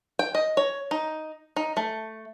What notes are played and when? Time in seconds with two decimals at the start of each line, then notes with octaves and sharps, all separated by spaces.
0.19 G5
0.35 D#5
0.57 C#5
0.91 D#4
1.56 D#4
1.77 A3